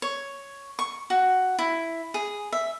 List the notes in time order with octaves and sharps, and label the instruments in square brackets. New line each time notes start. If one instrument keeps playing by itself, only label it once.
[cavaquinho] C#5
C#6
F#4
E4
G#4
E5